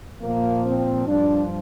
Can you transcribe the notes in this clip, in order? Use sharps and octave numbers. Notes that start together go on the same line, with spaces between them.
A#2 F3 A#3
C4
G2 F3 D4